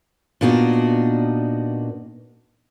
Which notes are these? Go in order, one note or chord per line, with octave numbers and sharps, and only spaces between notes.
A#2 B3 D4 D#4 F#4